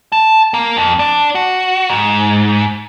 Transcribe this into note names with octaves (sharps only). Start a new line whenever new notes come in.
A5
A#3
F2
D4
F#4
G#2